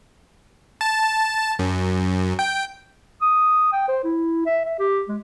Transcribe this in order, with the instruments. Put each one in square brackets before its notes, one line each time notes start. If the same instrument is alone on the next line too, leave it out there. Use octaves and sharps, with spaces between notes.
[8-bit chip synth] A5
F#2
G5
[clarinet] D#6
G5
C5
E4
E5
E5
G4
G#3